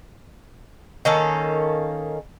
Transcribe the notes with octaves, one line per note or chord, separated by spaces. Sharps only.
D#3 A#3 C#4 A4